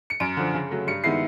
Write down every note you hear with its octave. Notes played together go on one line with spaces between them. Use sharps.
C#7
F#2 D7
D3 F3
C#3
F#3 A3
G2 C#7
D#3 G#3 B3 E4 C7